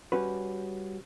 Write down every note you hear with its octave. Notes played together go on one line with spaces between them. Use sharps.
G3 C#4 F#4 B4